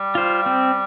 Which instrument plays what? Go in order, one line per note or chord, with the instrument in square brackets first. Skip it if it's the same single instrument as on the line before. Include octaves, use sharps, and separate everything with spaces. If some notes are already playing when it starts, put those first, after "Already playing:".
Already playing: [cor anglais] G3
[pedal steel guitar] F4 C5
C4